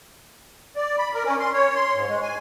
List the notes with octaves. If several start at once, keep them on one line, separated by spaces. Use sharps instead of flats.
D5
B5
A#4
C#4
C6
C#5
C6
G#2
G#3
G#5